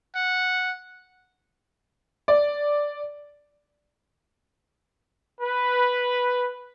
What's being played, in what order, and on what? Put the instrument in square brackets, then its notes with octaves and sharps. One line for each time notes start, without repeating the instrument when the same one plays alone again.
[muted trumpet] F#5
[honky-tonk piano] D5
[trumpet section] B4